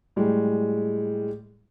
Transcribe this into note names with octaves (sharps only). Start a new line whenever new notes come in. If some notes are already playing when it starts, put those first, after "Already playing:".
A2 G3 G#3